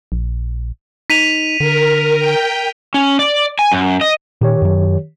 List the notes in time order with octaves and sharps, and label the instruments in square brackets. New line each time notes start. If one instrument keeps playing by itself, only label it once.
[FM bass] A#1
[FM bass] D#4 [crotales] B6 D#7 F7
[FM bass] D3 [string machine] A#4
[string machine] G5
[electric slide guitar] C#4
D5
G#5
F#2
D#5
[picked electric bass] A#2 [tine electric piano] D#3 G4 C#5
[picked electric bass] F#2 F#3